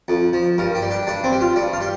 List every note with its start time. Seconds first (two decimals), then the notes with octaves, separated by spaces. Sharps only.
0.08 F2
0.33 F3
0.58 G2 A#4
0.75 G4
0.82 G3
0.91 D4
1.07 G2 D4
1.24 C4
1.32 G3
1.41 F4
1.56 G2 D5
1.73 F5
1.81 G3